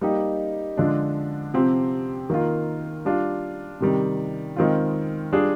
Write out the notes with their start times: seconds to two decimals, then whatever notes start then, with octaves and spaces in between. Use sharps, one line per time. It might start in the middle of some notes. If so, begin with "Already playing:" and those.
0.01 G3 A#3 D#4 G4
0.77 D3 F3 G#3 D4
1.54 C3 F3 C4 G4
2.30 D#3 A#3 F4
3.05 G3 D4 F4
3.80 C3 D#3 G3
4.56 D#3 G#3 C4 F4
5.32 G3 D4 F4 G#4